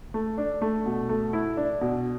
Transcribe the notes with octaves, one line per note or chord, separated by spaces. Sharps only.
A3
D4
A3
B2
A3
E4
D4
B2